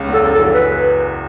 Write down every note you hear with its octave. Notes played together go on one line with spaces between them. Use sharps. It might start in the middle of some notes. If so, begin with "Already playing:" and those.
Already playing: C#2 C#3
E2
A4
F#2
A4
E2 E3
B4